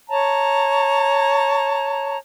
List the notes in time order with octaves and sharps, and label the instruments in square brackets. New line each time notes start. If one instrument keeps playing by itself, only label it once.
[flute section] C#5 A5 A#5